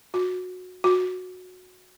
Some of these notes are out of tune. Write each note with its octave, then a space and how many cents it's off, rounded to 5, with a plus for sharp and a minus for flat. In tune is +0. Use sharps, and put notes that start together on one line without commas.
F#4 -20
F#4 -15